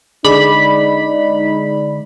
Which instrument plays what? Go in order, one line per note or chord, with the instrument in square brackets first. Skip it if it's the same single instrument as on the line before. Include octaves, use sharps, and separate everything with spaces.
[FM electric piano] D3 G#3 D5 [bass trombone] D#4 [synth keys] B5